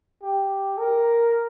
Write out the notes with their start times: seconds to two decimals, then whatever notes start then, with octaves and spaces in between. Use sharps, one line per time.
0.23 G4
0.78 A#4